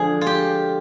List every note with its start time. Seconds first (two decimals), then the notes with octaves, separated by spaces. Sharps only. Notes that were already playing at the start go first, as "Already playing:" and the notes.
Already playing: D3 F3 G#3 G#4
0.21 F4
0.27 G4